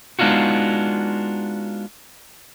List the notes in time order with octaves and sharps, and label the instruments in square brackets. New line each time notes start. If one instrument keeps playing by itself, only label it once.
[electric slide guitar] G#3 B3 D4 D#4 F4 F#4